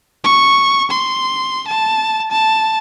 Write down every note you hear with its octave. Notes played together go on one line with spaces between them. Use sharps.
C#6
C6
A5
A5